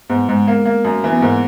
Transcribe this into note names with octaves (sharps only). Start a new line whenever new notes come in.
G#2 B3
G#2 G#3
A#3
A#3
F#2
E3 A#3
B3
G#2 A#3